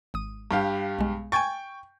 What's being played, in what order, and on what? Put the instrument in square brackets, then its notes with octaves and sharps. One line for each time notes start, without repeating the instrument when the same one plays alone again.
[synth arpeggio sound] G#1 D#6
[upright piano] G2 G4 F5
[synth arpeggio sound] B1 G#3
[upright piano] G5 C#6 [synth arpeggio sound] G#5 G#6 A6